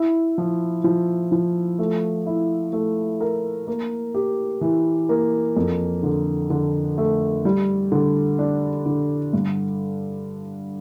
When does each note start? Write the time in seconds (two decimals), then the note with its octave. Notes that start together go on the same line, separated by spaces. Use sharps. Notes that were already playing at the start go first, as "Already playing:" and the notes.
Already playing: E4
0.38 F3
0.84 F3
1.32 F3
1.79 A3
2.26 E4
2.73 A3
3.20 A#4
3.67 A#3
4.14 G4
4.61 E3
5.09 A#3
5.56 F2
6.03 D3
6.50 D3
6.98 A3
7.45 G3
7.92 D3
8.39 D4
8.86 D3
9.33 G2